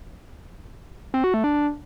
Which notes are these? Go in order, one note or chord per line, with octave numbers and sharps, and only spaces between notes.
C4
F#4
A3
D4
D4